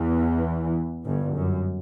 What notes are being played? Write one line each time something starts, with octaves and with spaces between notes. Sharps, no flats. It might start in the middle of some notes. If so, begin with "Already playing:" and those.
Already playing: E2 E3
G1 G2
F#2